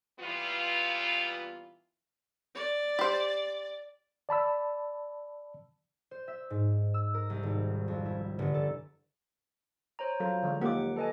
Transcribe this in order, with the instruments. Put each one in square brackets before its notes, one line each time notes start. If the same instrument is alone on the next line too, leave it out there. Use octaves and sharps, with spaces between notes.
[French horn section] A#2 E3 G3 B3 F4
[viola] D5
[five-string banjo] G4 C5
[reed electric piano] D5 A5 B5 E6
[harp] C5
E5
G#2
E6
A#4
C2
G#1
F2
E4
G1
A4
[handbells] C5 C#5 A#5
[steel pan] F#3 A4 A#4 [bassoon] F4
[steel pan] D3 F3 G#3
[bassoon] D#2 [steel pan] A#3 F4 G4 [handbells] F#5 D6
[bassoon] A4 [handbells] B4 D#5 G#5